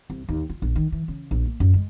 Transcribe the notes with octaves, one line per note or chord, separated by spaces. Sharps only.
C2
D#2
F4
A#1
D#3
E3
C#3
A#1
A#3
F#2
G#3